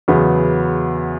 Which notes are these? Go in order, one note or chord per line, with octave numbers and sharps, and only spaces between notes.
E2 C#3 F#3 B3